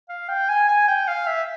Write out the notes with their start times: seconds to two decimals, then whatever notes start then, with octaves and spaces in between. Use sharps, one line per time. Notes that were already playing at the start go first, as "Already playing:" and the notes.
0.09 F5
0.29 G5
0.49 G#5
0.69 G#5
0.88 G5
1.08 F5
1.27 E5